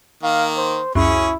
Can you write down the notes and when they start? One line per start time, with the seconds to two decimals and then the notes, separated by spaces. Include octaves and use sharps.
0.24 D#3 A#3 F5
0.57 C5
0.95 C#2 F#2 C#4 E4 G#4 C#6